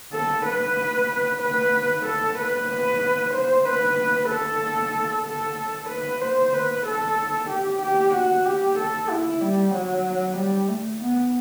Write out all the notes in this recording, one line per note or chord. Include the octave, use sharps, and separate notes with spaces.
A4
B4
B4
A4
B4
B4
C5
B4
A4
A4
B4
C5
B4
A4
G4
G4
F#4
G4
A4
E4
G3
F#3
G3
A3
B3